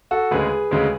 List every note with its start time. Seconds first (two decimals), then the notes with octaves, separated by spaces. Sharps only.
0.11 F#4 A4
0.31 D2 C#3 G#3 G#4 B4
0.71 D2 C#3 G#3